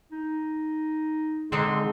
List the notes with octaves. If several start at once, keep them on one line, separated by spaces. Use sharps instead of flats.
D#4
D3 G#3 C4 D#4 C6